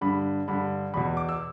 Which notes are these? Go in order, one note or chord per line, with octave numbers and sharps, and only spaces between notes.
G2 D3 B5
G2 D3 B5
E2 B2 B5
D6
E6